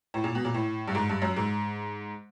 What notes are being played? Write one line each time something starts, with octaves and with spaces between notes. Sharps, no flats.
A2
A#2
B2
A#2
A2
G2
G#2
G2
F#2
G#2